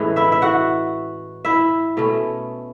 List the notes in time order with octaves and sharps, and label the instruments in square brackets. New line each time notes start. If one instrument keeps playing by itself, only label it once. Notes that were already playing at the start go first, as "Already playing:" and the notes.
Already playing: [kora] A2 E3 G#3 C#4
E4 E5
E5
F#4 F#5
E4 E5
B2 A3 C#4